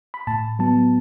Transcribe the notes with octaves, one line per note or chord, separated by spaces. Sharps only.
B5
A2 A5
F#3 B3 A5